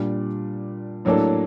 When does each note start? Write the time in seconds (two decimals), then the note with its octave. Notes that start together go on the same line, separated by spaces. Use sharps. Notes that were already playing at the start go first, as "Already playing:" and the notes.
Already playing: A#2 G3 D4
1.05 A2 F#3 A#3 D4 A4